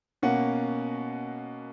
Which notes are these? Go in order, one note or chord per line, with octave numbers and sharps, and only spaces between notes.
B2 A#3 C#4 F#5